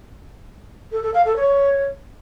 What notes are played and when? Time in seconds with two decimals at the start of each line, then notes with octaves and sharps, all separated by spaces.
0.92 A4
1.03 A4
1.14 F5
1.25 A4
1.36 C#5